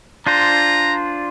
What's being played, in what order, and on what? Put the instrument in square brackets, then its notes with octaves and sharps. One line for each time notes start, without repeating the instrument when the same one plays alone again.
[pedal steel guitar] D4 F4 C5 [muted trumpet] A#5